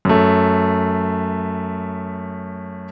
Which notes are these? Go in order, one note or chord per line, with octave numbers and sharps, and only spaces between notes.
F#2 A3